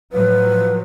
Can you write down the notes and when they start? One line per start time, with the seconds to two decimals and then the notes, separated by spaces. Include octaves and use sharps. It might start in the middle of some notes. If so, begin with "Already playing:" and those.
0.13 A2 F3 F#3 B4